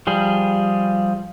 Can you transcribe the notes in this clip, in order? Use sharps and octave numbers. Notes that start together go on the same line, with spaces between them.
F3 G3 G#4